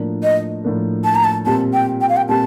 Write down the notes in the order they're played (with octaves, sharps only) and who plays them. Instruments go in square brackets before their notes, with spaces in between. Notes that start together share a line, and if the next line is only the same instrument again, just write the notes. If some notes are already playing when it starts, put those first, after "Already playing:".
Already playing: [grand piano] A2 F3 A#3 D4
[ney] D#5
[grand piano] A2 F3 A#3 D4
[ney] A5
A#5
A5
[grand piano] A#2 G3 C4 G4 [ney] A5
[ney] G5
G5
F5
G5
[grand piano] A#2 G3 C4 G4 [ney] A5